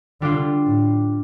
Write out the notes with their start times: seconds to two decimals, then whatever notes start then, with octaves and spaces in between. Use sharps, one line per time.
0.21 D3 G3 D4 F4
0.67 A2